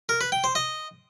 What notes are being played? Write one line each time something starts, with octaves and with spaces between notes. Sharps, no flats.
A#4
B4
G5
C5
D#5